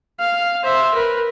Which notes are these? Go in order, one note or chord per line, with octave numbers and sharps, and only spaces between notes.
F5
C5 E5
A#4 B4